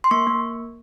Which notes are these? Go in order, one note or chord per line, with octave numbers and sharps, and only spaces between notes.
C6
A#3 C#6
A#3